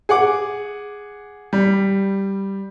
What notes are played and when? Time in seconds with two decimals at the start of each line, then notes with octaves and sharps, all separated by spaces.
0.09 G#4 F#5 D6
1.53 G3